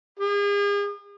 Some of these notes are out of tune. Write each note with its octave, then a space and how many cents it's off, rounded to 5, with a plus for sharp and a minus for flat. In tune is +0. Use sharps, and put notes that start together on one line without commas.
G#4 -40